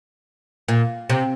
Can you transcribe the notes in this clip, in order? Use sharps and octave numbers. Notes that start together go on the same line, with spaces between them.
A#2
C3